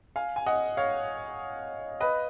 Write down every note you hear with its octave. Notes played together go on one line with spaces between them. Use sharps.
F5 G#5
G#5
D#5 F#5
C#5 F5
B4 D#5